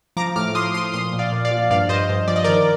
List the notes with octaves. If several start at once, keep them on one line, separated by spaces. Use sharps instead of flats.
F3 A#5 D6
A2 D6 F6
F3 C6 D#6
F3 C6 D#6
A#2 C6 D#6
A#2
D5 F5
A#2
D5 F5
F3
G2 D5 F5
G2 C5 D#5
G2
F3 D5
D#5
D#3 A#4 D5